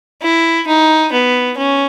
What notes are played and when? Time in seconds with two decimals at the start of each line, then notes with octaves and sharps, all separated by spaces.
0.22 E4
0.67 D#4
1.12 B3
1.57 C#4